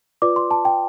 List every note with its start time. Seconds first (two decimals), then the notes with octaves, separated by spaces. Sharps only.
0.22 F4 B4 D5 D6
0.36 C6
0.51 A5
0.65 G5